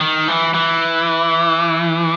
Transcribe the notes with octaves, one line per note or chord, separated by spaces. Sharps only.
D#3
E3
E3